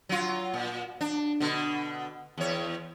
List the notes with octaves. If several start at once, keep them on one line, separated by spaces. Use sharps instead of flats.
F#3 F4
A#2
D4
B2 D3
E2 C#5